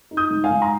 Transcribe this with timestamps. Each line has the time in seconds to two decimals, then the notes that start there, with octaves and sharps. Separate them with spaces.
0.11 D#4
0.17 D#6 G6
0.31 G#2
0.44 F5 G#5
0.50 G#2
0.62 A#5